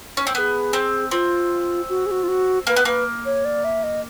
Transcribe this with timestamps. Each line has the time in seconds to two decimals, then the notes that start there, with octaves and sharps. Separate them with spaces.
0.17 C#4
0.27 C4
0.35 B3 B4
0.38 G#4
0.73 C4
1.11 C4 F4
1.89 F#4
2.06 G#4
2.11 F#4
2.23 F4
2.28 F#4
2.67 A#3 B4
2.76 B3
2.85 A#3 B4
3.25 C#5
3.45 D5
3.64 E5
3.83 D#5